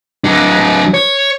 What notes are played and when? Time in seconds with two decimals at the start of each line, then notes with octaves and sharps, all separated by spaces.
0.24 F#3 D4
0.94 C#5